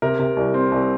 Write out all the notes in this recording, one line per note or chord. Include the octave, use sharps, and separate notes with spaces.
C3 A#4
C3
C2
C4
C2